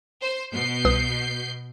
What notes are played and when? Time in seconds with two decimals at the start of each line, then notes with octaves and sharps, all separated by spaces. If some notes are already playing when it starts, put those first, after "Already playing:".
0.21 C5
0.52 B2 G6 C7
0.85 C2 B4 D#6